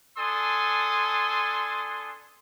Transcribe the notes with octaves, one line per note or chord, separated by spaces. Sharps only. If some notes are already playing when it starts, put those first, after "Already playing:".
D4 A4 G#5 C6 D#6